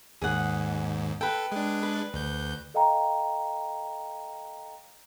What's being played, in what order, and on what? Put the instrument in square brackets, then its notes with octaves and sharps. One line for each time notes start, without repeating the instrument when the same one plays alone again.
[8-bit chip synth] D#2 G#2 [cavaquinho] G#4 F#5
[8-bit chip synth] A4 [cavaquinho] B4 G5
[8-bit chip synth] G#3 D4
[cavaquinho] B4
[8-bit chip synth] D2 G6
[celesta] A4 D#5 F5 G5 A#5